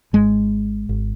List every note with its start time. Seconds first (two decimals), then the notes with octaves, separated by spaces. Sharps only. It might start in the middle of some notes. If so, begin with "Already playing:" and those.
0.13 G#1 G#2 G#3
0.89 G#1